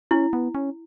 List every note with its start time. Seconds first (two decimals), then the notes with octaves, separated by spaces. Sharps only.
0.11 C#4 E4
0.33 B3
0.55 C#4